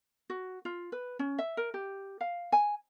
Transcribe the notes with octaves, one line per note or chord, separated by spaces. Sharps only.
F#4
F4
B4
C#4
E5
A#4
G4
F5
G#5